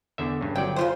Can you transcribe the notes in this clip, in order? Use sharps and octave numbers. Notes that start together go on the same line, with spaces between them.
E2 D3 E5
G2 C#3
G1 F#3 D5 G5
C#3 F4 C5